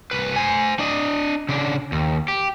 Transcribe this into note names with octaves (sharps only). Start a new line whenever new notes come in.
C2 B4
C5 G#5
D4 D#5
C#3 D4
D#2
G4